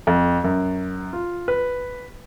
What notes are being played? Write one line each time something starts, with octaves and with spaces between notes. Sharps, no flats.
F2
F#2
F4
B4